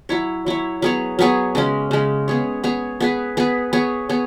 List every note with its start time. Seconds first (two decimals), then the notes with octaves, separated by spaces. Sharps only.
0.09 F#3 E4 C#5
0.46 F#3 E4 C#5
0.82 F#3 B3 G#4 C#5
1.19 F#3 B3 G#4 C#5
1.55 C#3 G#3 C#4
1.91 C#3 G#3 C#4
2.28 B3 G#4 C#5
2.64 B3 G#4 C#5
3.00 B3 G#4 B4
3.37 B3 G#4 B4
3.73 B3 G#4 C#5
4.09 B3 G#4 C#5